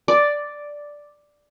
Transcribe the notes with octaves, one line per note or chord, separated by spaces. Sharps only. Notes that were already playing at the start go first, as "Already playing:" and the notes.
D5